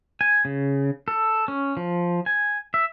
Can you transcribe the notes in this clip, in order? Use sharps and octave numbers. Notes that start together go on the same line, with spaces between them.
G#5
C#3
A4
C#4
F3
G#5
E5